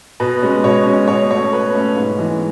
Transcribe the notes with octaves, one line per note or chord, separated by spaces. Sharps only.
B2 B4
G#3 C#4
B2 C#5
G#3 C#4
B2 C#5
A3 C#4 C#5
B2 B4
A3 C#4
G#2
E3 G#3 B3